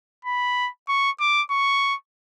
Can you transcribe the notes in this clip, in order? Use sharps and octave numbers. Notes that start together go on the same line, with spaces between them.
B5
C#6
D6
C#6